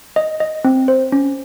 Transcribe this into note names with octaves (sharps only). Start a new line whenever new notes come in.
D#5
D#5
C4
C5
C#4